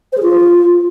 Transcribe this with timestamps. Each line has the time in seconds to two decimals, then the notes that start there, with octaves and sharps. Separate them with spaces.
0.13 C5
0.18 G#4
0.23 F4